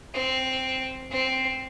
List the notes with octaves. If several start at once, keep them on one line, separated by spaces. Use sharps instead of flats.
C4
C4